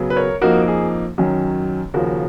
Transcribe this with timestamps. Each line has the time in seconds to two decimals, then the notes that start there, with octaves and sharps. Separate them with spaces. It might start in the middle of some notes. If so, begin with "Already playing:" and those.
Already playing: C#3 F#3 B3
0.10 B4
0.16 A#4 C#5
0.41 F2 F3 A#3 D#4 F#4 A#4
0.68 G#4
1.18 F#2 D#3 F#3 C#4
1.94 D#2 C#3 F3 F#4 A#4